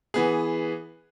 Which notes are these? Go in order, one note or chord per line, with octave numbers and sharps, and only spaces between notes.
E3 B3 G#4